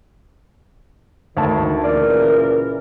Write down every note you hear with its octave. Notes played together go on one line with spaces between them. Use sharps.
D2 D#3 A5
A#2 C#3 E3 A#4 D5